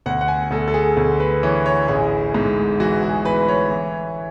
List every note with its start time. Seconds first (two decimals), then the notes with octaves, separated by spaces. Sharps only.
0.06 D2 F#5
0.21 F#5
0.28 G#5
0.51 D2 A4
0.68 A4
0.74 G#4
0.97 D2
1.20 B4
1.43 E3 C#5
1.66 C#5
1.88 A1 G#4
2.34 G#2
2.80 E3 F#4
3.03 G#4
3.25 E3 B4
3.43 B4
3.49 C#5
3.71 E3